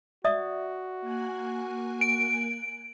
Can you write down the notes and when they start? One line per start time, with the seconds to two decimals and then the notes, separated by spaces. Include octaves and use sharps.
0.24 F#4 D5 E5 D#6
1.01 A#3 G#5 F#6
2.01 D7